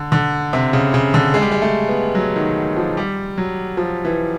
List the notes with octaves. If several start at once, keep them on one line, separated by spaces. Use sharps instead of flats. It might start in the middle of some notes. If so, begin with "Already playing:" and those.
Already playing: D3
D3
C3
C#3
C#3
D3
G#3
G3
G#3
A3
B3
F#3
D#3
F3
G3
F#3
F3
E3